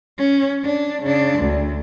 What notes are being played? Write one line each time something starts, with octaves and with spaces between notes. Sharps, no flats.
C#4
D4
C#3 D4
D2